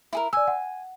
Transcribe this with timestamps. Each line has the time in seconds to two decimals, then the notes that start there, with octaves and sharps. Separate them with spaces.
0.13 E4 G#4 A#4
0.33 D5 G#5 E6
0.48 F#5